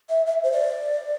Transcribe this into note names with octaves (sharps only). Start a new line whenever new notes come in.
E5
E5
C5
D5